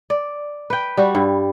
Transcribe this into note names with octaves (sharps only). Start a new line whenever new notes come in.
D5
B4 G5
G3 F#4
G2